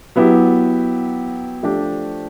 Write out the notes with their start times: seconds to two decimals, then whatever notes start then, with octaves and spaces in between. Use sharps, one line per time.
0.16 F#3 B3 E4 G4
1.63 F3 A3 D4 G4